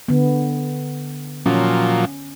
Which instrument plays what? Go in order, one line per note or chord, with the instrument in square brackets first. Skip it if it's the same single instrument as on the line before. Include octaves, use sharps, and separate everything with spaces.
[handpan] D3 B3
[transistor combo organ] A#2 F3 F#3 [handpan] C#4